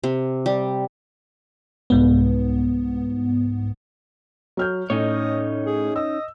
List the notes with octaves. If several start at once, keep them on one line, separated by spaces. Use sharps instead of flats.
C3
G3
C2 G#2 B3
F#3 F6 G6
A2 C#4 D#4 C#5 D#5
G#4
D#5 E6